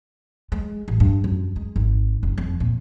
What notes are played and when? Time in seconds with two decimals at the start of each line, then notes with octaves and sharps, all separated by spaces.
0.52 G#3
0.88 A1
1.00 G2
1.24 F#2
1.56 G#3
1.76 G#1
2.23 F#1
2.38 F2
2.60 A#2